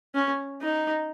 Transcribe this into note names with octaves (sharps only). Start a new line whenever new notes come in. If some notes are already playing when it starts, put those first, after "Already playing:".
C#4
D#4